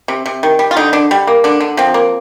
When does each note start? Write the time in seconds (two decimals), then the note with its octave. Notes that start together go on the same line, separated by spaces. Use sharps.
0.08 C3
0.26 C3
0.43 D#3
0.59 G3
0.71 F4
0.77 D3 D#4
0.93 D3 D4
1.11 G3
1.27 A#3
1.44 D3 D4
1.60 D3
1.77 F3 C4
1.94 A#3